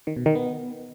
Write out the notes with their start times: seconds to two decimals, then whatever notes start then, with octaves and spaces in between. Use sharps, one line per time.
0.07 D#3
0.16 B2
0.26 D#3
0.35 B3